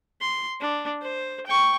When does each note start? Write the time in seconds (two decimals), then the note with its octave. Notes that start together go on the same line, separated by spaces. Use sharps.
0.21 C6
0.61 D4
1.02 C5
1.47 G5 C#6